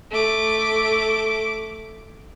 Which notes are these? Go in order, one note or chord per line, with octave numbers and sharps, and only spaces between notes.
A3 D6